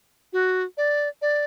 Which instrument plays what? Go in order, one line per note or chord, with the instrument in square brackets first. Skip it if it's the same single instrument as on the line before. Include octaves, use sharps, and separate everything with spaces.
[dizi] F#4
D5
D5